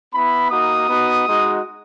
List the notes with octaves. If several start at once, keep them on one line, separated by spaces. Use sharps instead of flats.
B3 E4 B5
A#3 D#4 F#4 D#6
B3 D#4 F#4
G#3 D#4 F#4